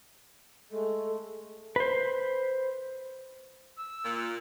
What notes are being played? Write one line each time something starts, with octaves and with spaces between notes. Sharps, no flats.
G#3 A3 A4
B4 C5
E6
A#2